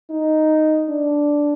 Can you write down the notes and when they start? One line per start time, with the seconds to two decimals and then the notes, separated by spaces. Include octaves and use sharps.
0.10 D#4
0.89 D4